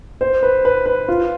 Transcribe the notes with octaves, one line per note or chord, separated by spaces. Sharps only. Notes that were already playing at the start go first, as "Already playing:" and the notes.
C5
B4
B4
B4
F4